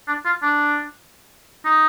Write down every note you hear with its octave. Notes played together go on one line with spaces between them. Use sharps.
D4
F4
D4
D#4